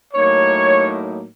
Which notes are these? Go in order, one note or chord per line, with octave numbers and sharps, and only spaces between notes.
A2 F#3 A#3 D#4 C#5